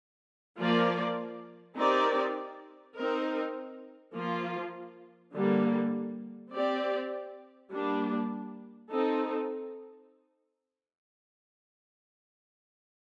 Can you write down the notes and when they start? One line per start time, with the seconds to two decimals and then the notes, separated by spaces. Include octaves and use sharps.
0.58 F3 A#3 F4 A#4 D5
1.77 C4 D#4 G4 A#4 D5
2.95 C4 D#4 A#4
4.15 F3 A#3 F4
5.34 D3 G3 A#3
6.53 C4 G4 D5
7.72 G3 A#3 D4
8.90 C4 D#4 A4